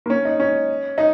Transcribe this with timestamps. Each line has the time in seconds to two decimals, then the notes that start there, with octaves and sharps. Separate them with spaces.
0.06 A#3
0.10 C#4
0.25 D#4
0.40 C#4
0.98 D#4